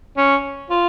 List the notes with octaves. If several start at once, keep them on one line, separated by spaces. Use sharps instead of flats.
C#4
F4